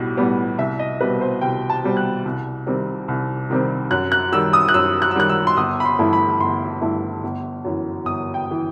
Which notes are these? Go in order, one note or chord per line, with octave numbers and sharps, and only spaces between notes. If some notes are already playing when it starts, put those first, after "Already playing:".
Already playing: B1 A2 G3
A2 G3 B3
C2 E5
D#5
B2 G3 C4 B4
C5
C2 G5
A5
B2 G3 C4
F#6
C2
C3 D#3 G3 C4
C2
C3 D#3 G3 C4
F#2 F#6
F#6
D#3 G3 E6
D#6
F#6
F#2 E6
F#6
E6
D#3 G3 F#6
E6
C6
G1 D#6
B5
C6
G2 E3 A3 E4
B5
G1 C6
G2 E3 A3 E4
G1
F#2 E3
G1 D#6
G5
E3